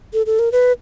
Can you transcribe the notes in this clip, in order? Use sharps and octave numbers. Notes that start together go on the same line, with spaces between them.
A4
A4
A#4
B4